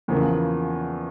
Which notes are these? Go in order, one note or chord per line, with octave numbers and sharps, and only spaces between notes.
E2 C#3 F3 A#3